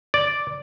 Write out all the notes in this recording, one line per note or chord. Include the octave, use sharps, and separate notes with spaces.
D5